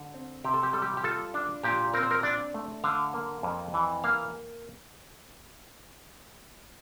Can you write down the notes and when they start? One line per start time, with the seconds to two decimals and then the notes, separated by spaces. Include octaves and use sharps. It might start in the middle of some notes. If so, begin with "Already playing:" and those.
Already playing: D3
0.14 C4
0.44 C3 G4
0.54 A4
0.63 G4
0.73 G3 A4
0.82 G4
0.97 G4
1.03 F4 A4
1.34 D4
1.63 A#2 G4
1.94 C4 A#4
2.03 C5
2.11 A#4
2.23 D4 D5
2.54 A3
2.84 D3 F5
3.14 A#3
3.43 F2
3.74 E3
4.04 A#3 F5